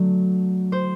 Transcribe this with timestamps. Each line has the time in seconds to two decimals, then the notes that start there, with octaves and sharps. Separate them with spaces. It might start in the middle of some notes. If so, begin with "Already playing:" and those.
Already playing: D3 F#3 A3
0.72 C5